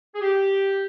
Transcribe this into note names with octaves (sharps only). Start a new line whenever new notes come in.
G#4
G4